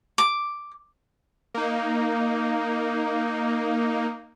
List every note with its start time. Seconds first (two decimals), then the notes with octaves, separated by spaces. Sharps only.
0.18 D6
1.54 A#3 D#4